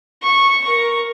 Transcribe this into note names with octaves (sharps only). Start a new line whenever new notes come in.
C#6
A#4 C#6